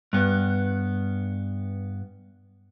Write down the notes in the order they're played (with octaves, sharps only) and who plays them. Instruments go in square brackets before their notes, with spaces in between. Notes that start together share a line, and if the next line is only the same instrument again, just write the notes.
[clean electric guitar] G2 B3